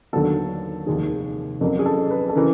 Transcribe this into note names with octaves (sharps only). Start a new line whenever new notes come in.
D#2 D3 F#3 B3 A4
F1 D#2 D#3 G#4
F2 C#3 F#3 A#4
G#4
A4
B4
A4
C#3 E3 A#4